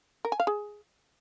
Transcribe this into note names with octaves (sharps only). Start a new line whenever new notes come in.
A#4
G#5
F5
G#4